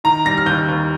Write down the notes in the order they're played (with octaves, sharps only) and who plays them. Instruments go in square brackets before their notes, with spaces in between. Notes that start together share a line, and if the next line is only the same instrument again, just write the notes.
[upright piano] D#3 A#5
G3 A#6
F6
D#2 G6
D#2